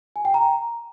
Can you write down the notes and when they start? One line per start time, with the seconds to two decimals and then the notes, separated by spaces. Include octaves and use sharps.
0.16 G#5
0.25 G5
0.34 A#5